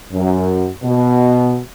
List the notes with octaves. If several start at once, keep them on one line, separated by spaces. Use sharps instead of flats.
F#2
B2